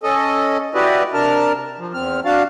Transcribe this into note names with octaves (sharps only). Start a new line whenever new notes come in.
C#4 A4 D#5
E4 F#4 G4 B4 D5 D#5
C3 D4 A#4 A5 F6
F3
E2 C4 F6
D4 F#4 F5 A5